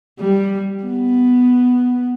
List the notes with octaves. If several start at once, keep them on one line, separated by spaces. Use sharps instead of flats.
G3
B3